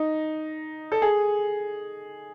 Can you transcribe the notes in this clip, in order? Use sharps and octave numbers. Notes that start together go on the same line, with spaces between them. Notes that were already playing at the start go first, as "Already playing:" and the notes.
Already playing: D#4
A4
G#4